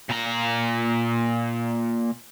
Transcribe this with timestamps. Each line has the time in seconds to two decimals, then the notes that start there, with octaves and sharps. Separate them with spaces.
0.09 A#2 A#5